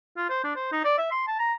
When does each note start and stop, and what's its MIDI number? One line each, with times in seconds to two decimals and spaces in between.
0.17 0.25 65
0.29 0.42 72
0.44 0.54 62
0.56 0.71 72
0.72 0.84 63
0.84 0.93 74
0.98 1.07 76
1.11 1.25 84
1.28 1.35 81
1.39 1.54 82